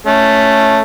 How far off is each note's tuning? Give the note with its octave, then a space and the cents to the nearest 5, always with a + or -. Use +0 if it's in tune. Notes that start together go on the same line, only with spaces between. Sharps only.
A3 +0 C#4 +0